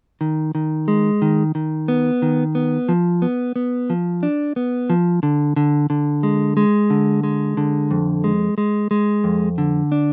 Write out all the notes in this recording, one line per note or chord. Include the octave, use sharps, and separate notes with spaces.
D#3
D#3
G#3
D#3
D#3
B3
D#3
B3
F3
B3
B3
F3
D4
B3
F3
D3
D3
D3
G#3
G#3
D3
G#3
D3
F2
G#3
G#3
G#3
F2
D3
D4